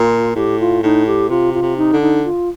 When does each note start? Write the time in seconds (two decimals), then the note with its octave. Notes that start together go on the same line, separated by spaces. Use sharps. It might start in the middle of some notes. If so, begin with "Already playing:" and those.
Already playing: A#2 F4
0.35 A2 G4
0.59 F4
0.83 A2 D#4
1.06 G4
1.29 C3 F4
1.54 F4
1.62 C3
1.77 D#4
1.93 D3
2.01 D#4
2.24 F4